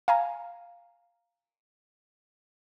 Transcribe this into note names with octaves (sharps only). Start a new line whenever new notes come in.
F5 G#5 A#5